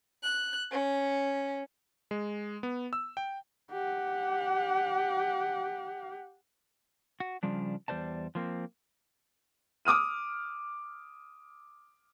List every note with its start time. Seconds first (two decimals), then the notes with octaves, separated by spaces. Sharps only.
0.22 F#6
0.71 C#4
2.11 G#3
2.63 B3
2.93 E6
3.17 G5
3.72 G4 F#5
7.20 F#4
7.43 C#3 F3 G3 D4
7.88 E2 G3 C5 D5 A5
8.35 F3 A#3 C4
9.85 D6 D#6 F6 D#7